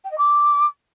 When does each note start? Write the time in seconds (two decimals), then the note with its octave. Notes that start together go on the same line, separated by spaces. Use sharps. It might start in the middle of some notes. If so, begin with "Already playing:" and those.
0.04 G5
0.11 D#5
0.18 D6